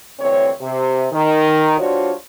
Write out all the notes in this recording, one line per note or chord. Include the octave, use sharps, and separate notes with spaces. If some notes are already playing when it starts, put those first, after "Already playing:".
D2 G2 E3 C4 C#5
C3
D#3
G3 D4 F4 F#4 C5 C#5